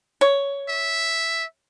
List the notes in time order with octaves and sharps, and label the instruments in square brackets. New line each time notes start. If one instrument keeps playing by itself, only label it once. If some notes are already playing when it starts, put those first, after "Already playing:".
[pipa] C#5
[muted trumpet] E5